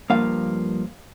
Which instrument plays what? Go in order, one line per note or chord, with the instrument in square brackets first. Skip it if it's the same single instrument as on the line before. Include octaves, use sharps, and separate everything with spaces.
[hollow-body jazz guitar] G2 F3 A#3 F5